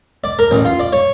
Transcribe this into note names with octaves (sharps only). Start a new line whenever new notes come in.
D5
A#4
A1
F4
D5
C#5